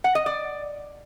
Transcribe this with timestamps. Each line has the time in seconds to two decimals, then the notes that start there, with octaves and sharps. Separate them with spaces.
0.04 F#5
0.15 D#5
0.26 D5